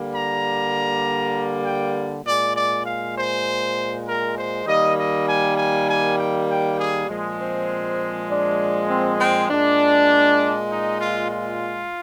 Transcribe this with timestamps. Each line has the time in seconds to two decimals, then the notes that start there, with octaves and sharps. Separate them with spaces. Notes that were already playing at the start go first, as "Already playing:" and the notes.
Already playing: D3 G3 A#3
0.13 A#5
1.64 G5
2.25 A#2 G#3 D5
2.55 D5
2.85 F5
3.15 C5
4.06 A#4
4.36 C5
4.66 D#3 G3 A#3 D#5
4.96 D#5
5.26 G#5
5.56 G#5
5.87 G#5
6.17 G5
6.47 G5
6.78 G#4
7.07 A#2 F3 G#3
7.38 C4
8.28 D4
8.89 C4
9.19 C4
9.49 A#2 G#3 D4
10.70 D#4
11.00 F4
11.30 F4